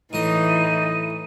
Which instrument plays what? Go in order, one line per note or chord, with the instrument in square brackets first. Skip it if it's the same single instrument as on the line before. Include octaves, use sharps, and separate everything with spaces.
[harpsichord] A2 D#5 [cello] E3 [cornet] D#4 [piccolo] D#7